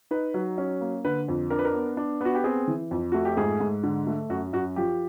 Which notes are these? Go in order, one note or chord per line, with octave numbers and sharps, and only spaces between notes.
D#4 B4
F#3
C#4
A#3
D3 B4
F2
D4 A#4
B4
A#4
B3
D4
B3 F#4
G4
C4 G#4
E3
F2
A3 F#4
G4
G#2 G#4
G#2
D3
A3
F#2 F#4
F#2 F#4
F3 G4